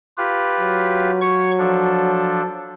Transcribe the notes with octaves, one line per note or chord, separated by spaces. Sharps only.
F4 G4 B4
F#3
C#5 C#6
F3 D4 A4